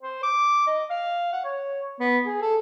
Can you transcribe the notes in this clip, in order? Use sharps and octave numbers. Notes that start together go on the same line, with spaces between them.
C5
D6
D#5
F5
F#5
C#5
B3
G#4
A4